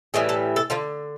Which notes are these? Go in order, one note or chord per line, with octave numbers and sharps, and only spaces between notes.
A2 E3 G3 G#4
A4
A4
D3 F3 F4